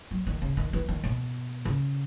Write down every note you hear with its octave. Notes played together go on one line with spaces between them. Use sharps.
F#3
D#3
C#3
D#3
E3
D#3
B2
C#3